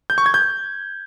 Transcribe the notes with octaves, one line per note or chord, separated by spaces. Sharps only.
G6
C#6
G#6
G6